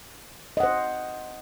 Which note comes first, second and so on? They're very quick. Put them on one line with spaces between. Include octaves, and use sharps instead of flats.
D#5 F#5 C5